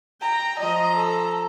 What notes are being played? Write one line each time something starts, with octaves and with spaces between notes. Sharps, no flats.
G5 A#5
F3 D#5 A#5
A4